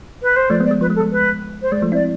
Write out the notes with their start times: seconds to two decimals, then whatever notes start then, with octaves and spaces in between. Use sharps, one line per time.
0.22 B4
0.36 C5
0.50 F3 A3 D5
0.60 G#3 B3
0.65 D5
0.71 G#3
0.81 F3 B4
0.90 G#3
0.95 A4
1.00 G#3
1.12 B4
1.62 C5
1.72 G#3 D5
1.82 F3 A3
1.92 C4 E4 D5